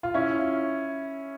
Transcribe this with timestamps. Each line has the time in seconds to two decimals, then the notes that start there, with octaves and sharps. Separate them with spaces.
0.03 F4
0.14 C#4 E4